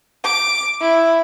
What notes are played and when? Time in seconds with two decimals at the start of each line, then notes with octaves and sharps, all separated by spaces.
0.24 D6
0.81 E4